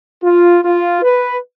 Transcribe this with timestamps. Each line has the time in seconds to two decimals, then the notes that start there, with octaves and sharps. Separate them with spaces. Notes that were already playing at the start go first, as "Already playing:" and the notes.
0.23 F4
0.64 F4
1.02 B4